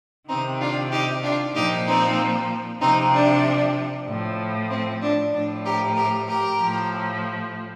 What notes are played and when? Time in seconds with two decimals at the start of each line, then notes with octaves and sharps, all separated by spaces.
0.29 C3 D#3 C4 D#4
0.60 D4 F4
0.92 D#4 G4
1.23 D4 F4
1.55 A#2 F3 D#4 G4
1.86 C4 D#4
2.81 C3 F3 C4 D#4
3.13 D4
4.08 A2 F3
4.70 C4
5.02 D4
5.33 A2 F3 D4
5.65 G4 A#4
5.96 G4 A#4
6.28 G4 A#4
6.60 A2 F3